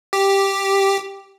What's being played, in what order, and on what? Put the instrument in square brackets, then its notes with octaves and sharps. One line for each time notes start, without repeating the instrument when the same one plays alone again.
[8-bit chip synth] G4